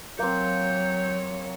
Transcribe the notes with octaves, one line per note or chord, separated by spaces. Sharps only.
F#3 A#3 C4 C#5 G6